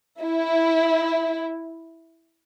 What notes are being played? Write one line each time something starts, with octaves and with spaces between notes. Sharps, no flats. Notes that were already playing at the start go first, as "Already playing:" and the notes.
E4